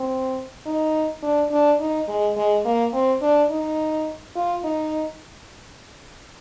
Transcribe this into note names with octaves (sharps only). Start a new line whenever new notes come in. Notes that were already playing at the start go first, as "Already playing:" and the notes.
Already playing: C4
D#4
D4
D4
D#4
G#3
G#3
A#3
C4
D4
D#4
F4
D#4